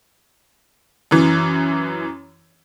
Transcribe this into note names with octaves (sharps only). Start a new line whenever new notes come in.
F#2 E3